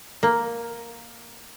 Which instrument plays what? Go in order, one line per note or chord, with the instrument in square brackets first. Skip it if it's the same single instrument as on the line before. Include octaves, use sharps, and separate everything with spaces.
[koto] A#3